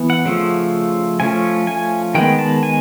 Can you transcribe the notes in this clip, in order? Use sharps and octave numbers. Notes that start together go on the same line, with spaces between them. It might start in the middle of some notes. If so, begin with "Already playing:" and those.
Already playing: E3 B3
F#5
C#3 F3 A3
F3 A3 C#4 G#5
G#5
D#3 G#3 B3 G5
A5
G#5